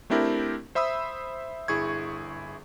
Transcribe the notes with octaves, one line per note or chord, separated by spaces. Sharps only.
A3 C4 D4 E4 G4 A#4
C5 E5 B5 D#6 E6
G1 E4 G#4 C#6 G#6